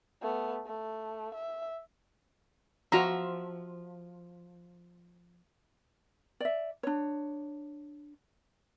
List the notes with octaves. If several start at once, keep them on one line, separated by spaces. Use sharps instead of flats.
A3 B3
A3
E5
F3 F#4 E5 A#5
D5 E5
D4 C#5